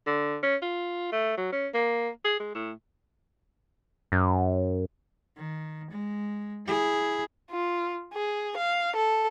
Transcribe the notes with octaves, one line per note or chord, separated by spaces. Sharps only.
D3
C#4
F4
A3
F#3
C#4
A#3
G#4
G#3
A2
F#2
D#3
G#3
E4 G#4
F4
G#4
F5
A4